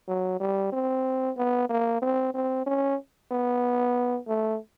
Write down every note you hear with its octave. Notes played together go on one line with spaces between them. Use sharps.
F#3
G3
C4
B3
A#3
C4
C4
C#4
B3
A3